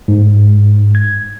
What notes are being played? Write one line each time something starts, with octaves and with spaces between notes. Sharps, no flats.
G#2
G#6